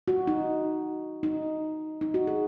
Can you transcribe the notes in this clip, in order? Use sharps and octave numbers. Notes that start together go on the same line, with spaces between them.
F#4
D#4
D#4
D#4
F#4
G#4